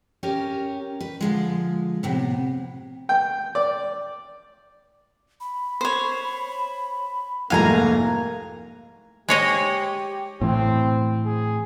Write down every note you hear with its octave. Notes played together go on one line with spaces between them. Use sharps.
C#4 G4 A#4
B4
D3 F3 G#3
A2 C3 B3
G5
D5
B5
C5 C#5
C2 F2 G#2 A3 A#3 F5 G#5 A#5
G#3 G4 C#5 D#5
A2 E3 C4
G#4